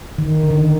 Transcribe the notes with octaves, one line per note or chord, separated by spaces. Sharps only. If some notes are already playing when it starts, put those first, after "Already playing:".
D#3
D3
D#3